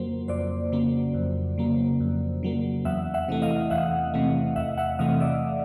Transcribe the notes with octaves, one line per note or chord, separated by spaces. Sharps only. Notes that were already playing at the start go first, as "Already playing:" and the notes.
Already playing: F2 C#3 F#3 A#3 C5
F2 C5 D5
C#3 F#3 A#3
F2
C#3 F#3 A#3
F2
C#3 F#3 A#3
E2 E5 F#5
E5 F#5
C3 E3 A3
D#5 F5
E2 E5 F#5
C3 E3 A3
E2 E5 F#5
E5 F#5
C3 E3 A3 D#5 F5
D5 E5